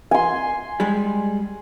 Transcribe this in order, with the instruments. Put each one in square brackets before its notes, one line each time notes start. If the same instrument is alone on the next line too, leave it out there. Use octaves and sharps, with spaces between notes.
[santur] G#5 C6
[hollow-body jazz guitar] G3 G#3